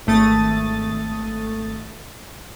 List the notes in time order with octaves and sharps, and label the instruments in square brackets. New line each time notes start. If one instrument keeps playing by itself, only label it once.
[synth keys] G#1 A3 D#6 A6